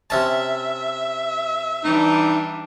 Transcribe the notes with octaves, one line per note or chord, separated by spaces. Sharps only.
C3 C#4 E5 A5
E3 G3 D4 D#4